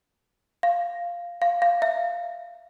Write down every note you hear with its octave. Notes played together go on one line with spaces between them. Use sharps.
F5
F5
F5
E5